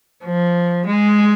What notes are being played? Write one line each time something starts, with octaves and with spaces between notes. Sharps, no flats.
F3
G#3